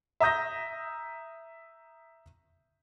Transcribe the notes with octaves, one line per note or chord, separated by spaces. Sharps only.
E5 A#5 D#6 G6 A#6